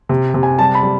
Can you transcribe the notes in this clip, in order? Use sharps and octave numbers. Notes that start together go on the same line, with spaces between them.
C3
C3
G#5
G3 A5
B5
G3